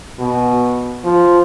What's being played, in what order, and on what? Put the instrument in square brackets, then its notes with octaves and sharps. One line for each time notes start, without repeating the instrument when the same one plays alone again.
[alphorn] B2
F3